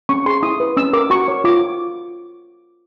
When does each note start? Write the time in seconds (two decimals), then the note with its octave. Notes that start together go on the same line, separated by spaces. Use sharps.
0.09 C#4 C#6
0.26 G#4 C6
0.43 E4 D#6
0.60 B4
0.77 C#4 E6
0.93 A#4 D6
1.10 F#4 C#6
1.28 C#5
1.44 F4 D6